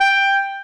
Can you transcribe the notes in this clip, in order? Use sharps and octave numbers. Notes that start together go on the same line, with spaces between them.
G5